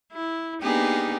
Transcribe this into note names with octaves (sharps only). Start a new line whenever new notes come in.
E4
A#3 B3 D4 D#4 G4 G#4